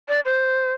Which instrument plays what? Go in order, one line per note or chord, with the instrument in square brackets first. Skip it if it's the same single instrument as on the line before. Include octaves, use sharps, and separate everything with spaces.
[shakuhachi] D5
C5